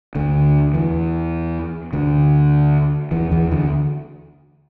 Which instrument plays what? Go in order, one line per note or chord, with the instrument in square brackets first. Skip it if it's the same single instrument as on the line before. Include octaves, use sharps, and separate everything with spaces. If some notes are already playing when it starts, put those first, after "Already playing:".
[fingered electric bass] D2 D3
E2 E3
D2 D3
E2 E3
E2 E3
D2 D3